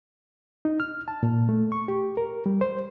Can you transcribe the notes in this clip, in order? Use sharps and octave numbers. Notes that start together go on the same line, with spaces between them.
D#4
F6
A5
A#2
A3
C#6
G4
A#4
G3
C5